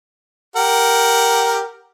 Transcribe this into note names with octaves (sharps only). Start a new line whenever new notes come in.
G4 A#4 F#5